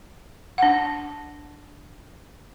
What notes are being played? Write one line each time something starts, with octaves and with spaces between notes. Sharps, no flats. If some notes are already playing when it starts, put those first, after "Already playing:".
D4 F#5